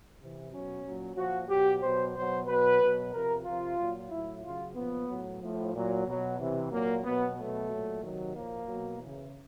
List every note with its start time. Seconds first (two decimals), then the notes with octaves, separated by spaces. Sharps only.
0.20 C3 E3
0.51 B2 F#3 C#4
0.84 A#2 F#3
1.17 A#2 F3 F#4
1.49 B2 F#3 G4
1.81 B2 F#3 C5
2.15 B2 F#3 C5
2.47 B2 F#3 B4
2.80 B2 F#3
3.12 C3 F3 A#4
3.45 C3 F3 F4
3.78 A#2 F#3
4.10 A2 F#3 E4
4.43 C#3 F#3 F4
4.75 A#2 F3 B3
5.08 A2 F#3
5.40 A2 F3
5.73 A#2 F#3
6.06 B2 F#3
6.39 C3 E3
6.71 A#2 F#3 A#3
7.04 B2 F#3 B3
7.36 B2 F#3 A3
7.69 A#2 F#3
8.02 C3 D#3 F#3
8.34 A#2 F3 A#3
8.67 B2 F#3
8.99 C#3 E3